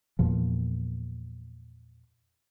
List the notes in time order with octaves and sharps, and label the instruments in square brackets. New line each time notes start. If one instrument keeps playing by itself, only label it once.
[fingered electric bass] E2 A#2 F3